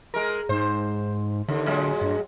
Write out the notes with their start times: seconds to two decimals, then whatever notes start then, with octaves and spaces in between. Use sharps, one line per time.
0.14 G#3 A#4
0.49 G#2 C5
1.49 D#2 D3
1.66 A2 F#3 G#3
2.01 G2